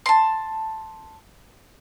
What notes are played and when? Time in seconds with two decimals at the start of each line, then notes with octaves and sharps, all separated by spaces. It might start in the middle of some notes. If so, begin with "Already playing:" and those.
0.06 A5 C6